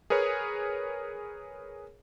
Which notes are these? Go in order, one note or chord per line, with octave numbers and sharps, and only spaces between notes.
G#4 A#4 B4 C#5